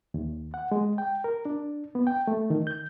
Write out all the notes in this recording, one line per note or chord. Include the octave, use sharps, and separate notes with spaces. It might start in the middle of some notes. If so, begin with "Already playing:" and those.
D#2
F#5
G#3
G5
A#4
D4
B3
G5
A3
D#3
G6